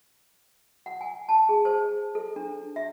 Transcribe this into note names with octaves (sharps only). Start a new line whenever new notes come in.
F#5
G#5
A5
G#4
C5
A4
D4
E5